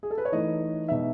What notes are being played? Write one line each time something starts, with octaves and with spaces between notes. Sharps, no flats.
G#4
A4
B4
C#5
E3 A3 D#4 D#5
B2 G#3 B3 D#4 E5